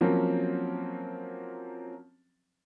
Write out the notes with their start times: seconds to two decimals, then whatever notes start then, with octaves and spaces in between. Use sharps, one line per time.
0.01 F3 F#3 A#3 C4 C#4